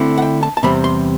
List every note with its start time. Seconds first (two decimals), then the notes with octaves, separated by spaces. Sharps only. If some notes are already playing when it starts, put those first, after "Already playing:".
Already playing: D3 A3 C4 E4
0.18 F#5
0.22 G5
0.43 A5
0.57 A5
0.63 E2 C3 G3 C4 B5
0.84 C6